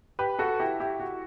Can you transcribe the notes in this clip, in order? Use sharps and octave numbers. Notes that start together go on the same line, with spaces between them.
G4 B4
F#4 A4
E4 G4
E4 G4
F#4